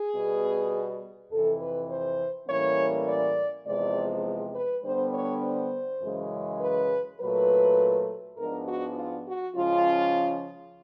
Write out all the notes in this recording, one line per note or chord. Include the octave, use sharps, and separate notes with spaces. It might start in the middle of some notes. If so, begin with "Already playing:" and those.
Already playing: G#4
B2 G3 B3
F2 C3 E3 A4
B4
C5
A2 E3 G3 A#3 C#4 C#5
D5
E2 C3 F3 G#3 C4 D5
B4
D3 G3 B3 D4 C5
C#5
C5
F#2 C#3 E3 G#3
B4
A#2 F#3 A3 B4
G#2 F3 G#3 B3 D4 A#4
F#4
F4
F#4
C#3 F3 G#3 C#4 F4